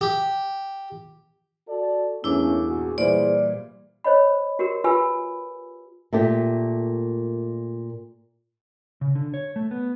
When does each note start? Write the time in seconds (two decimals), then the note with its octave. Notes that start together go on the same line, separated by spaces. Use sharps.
0.01 G4
1.68 F#4 A4 D5
2.24 E2 G2 A3 A#3 C#4 E4 D6
2.67 A#2 F#4 G#4
2.98 A#2 E3 G3 E4 G#4 C5 D5
4.04 C5 C#5 D#5 B5
4.59 F#4 G4 A#4
4.84 F4 G4 B4 G#5 B5 E6
6.13 A#2 A3 G4
9.01 C#3
9.15 D3
9.34 C#5
9.56 A3
9.71 B3